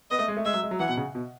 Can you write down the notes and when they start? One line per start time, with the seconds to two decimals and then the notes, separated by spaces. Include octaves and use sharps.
0.11 B3 D#5
0.19 A3
0.28 G#3
0.37 A3
0.45 G#3 E5
0.54 F#3
0.63 G#3
0.71 F#3
0.80 E3 F#5
0.89 B2
0.97 C#3
1.15 B2